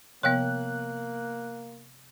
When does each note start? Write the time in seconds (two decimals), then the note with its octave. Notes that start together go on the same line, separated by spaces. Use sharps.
0.23 C3 F3 A#3 B3 C#5 F5 G5 F#6